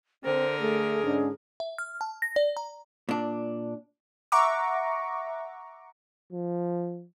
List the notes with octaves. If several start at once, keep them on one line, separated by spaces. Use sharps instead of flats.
D3 C4 A#4 C5
A3 G#4
G#2 C#4 D4
E5
F6
A5
A#6
D5
A#5
A#2 D4
E5 F#5 A#5 C#6 D6
F3